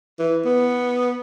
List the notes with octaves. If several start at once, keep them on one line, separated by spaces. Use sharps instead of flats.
E3
B3